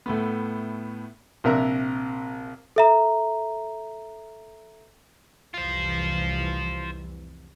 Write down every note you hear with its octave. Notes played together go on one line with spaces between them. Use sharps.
A2 A3 B3
A#1 C3 A#4 E5 A#5 F#6
A4 E5 A#5
F1 C2 E3 F4 C5